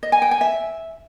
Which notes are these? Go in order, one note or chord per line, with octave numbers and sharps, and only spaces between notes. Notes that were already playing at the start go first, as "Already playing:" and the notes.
D#5
G#5
G5
G#5
E5